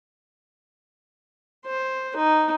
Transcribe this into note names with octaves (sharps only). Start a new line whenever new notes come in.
C5
D#4